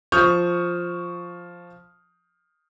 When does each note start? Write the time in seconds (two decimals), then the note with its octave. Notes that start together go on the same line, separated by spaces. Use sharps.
0.12 F3 C#6 D#6 F6 G6 F7